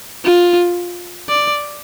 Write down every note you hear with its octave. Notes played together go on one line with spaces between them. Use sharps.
F4
D5